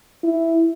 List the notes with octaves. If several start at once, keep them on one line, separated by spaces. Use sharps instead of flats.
E4